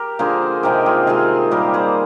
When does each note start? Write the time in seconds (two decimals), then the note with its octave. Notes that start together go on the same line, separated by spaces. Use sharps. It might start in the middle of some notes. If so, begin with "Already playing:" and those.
Already playing: G4 A#4
0.19 D3 F3 A#3 G#4 C5
0.63 C3 D#3 G#3 C4 G4 A#4
0.86 F4 G#4
1.07 C3 D#3 G#3 C4 F4 G#4
1.51 A#2 G3 A#3 G4 A#4
1.74 G#4 C5